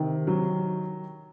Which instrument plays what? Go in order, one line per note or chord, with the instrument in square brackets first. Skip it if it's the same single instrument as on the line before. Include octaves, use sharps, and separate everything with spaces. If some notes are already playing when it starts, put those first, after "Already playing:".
Already playing: [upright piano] C3 D#3
F#3